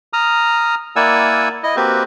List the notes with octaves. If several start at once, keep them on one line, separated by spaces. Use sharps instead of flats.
A#5 D#6 F6
A#3 E4 D5 F#5 G#5 E6
E4 D#5
A#3 C4 F#4 G4 B4